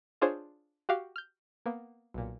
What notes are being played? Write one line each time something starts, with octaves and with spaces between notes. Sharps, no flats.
D4 F4 G#4 C5 C#5
F#4 G4 F5
F6 G6
A#3 B3
B1 A#2